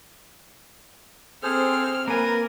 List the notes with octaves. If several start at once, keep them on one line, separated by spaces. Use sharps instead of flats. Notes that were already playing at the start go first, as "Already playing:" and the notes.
C4 G#4 A4 C5 F6
A#3 A#4 B4 G#5